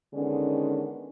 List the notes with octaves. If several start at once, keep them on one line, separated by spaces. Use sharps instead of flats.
D3 D#3 G#3 B3 C#4